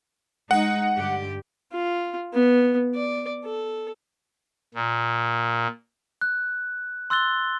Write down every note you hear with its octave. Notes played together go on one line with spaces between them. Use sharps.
G#3 D#4 F#5
G2 D3 G4
F4
B3
D5
A4
A#2
F#6
C6 E6 F#6 A6 G7